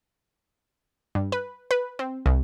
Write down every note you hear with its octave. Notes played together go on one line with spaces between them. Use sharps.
G2
B4
B4
C4
C2